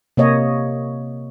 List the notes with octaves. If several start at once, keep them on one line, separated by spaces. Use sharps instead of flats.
C3 A#3 C#5 D#5